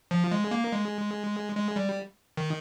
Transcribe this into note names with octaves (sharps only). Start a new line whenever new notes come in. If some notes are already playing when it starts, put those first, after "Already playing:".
F3
G#3
A#3
G#3
G#3
G3
D#3